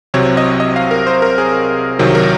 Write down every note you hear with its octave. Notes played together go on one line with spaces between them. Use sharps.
C2 C3 F#3 C4 C#5
D#5
D#5
F5
A#4
C5
A#4
G#4
C2 C3 D#3 F#3
A#4